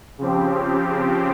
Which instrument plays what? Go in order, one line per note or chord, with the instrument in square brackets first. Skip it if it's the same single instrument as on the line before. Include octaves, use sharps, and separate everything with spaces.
[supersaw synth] C#3 F3 C4 G4